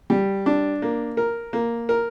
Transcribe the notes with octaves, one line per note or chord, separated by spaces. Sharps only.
G3
D4
A#3
A#4
A#3
A#4